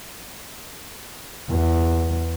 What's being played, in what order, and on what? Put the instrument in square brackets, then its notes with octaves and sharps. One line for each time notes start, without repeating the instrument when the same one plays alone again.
[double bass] E2